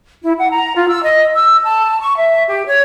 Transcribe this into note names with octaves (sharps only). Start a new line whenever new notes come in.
E4
F#5
A#5
F4
E6
D#5
E6
A5
C#6
E5
G4
C#5